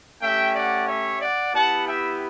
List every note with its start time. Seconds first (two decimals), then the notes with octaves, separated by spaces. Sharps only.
0.22 A3 C#4 G4 E5 G5
0.54 D5 F#5
0.87 C#5 E5
1.21 D5 F#5
1.53 B3 E4 G4 F#5 A5
1.87 E5 G5